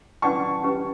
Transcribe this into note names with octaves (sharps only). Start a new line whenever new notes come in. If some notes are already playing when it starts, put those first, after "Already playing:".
C#4 E4 B4 D5 F#5 A5 C#6
C#4 G4 B4